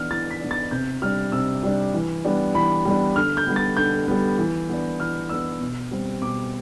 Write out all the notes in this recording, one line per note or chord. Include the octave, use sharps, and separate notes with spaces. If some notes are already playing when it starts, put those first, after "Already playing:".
Already playing: E3 B3 D4 F6
E3 A6
B6
B3 D4
A6
C3 G6
G3 D4 F6
C3 E6
G3 D4
E3
G3 B3 D4
E3 B5
G3 B3 D4
D3 F6
G6
G3 B3
A6
D3 G6
G3 B3
E3
B3 D4
E3 F6
B3 D4 E6
B2
G3 C4
B2 D6